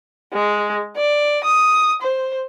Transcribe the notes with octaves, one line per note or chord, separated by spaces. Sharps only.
G#3
D5
D#6
C5